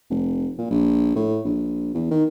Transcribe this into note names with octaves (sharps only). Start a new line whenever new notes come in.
F1
A#2
A#1
A2
A#1
E2
D#3